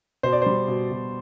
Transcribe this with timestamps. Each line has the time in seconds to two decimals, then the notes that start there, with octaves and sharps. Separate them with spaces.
0.23 B2 C5
0.32 D5
0.42 G3 C5
0.68 B2
0.91 B2